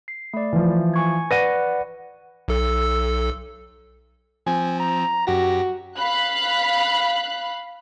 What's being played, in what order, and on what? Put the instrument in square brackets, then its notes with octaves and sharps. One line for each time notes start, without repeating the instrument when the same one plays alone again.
[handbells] C7
A3 D5
[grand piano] E3 F3
[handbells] G#5 C#6 G#6
[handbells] B4 D5 F#5 [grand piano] A#6 D#7
[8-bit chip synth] B1 A4 E6
[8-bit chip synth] F3 C4 [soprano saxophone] G#5
[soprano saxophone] A#5
[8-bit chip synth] F#2 G4 A#6 [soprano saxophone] F#4
[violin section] F5 B5 F#6